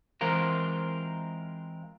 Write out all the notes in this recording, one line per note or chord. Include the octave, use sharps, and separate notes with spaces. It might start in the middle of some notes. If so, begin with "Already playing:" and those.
E3 G#3 C4 F4 A#4